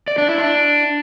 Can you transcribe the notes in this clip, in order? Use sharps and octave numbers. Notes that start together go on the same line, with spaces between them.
D5
D4
E4
D4